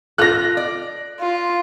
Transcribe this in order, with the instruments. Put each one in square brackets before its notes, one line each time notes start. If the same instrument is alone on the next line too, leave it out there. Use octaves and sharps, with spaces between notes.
[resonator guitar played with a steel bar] F4 A4 [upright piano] F#6 A#6
[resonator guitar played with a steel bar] D5
[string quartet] F4